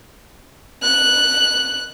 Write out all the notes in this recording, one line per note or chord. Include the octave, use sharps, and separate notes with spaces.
F#6